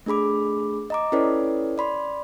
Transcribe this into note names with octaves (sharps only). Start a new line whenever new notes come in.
A3 D4 G#4 B5 D6
D#5 A#5 D6
C#4 E4 A4 B4 C#5 D5
D5 B5 C6